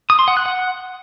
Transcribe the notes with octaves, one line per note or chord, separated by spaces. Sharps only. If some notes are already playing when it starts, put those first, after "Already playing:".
D#6
C6
F#5
F#6
F#5